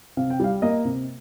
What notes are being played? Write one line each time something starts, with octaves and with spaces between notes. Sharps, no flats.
C3 F5
G5
G3 F5
A#3 D#5
C3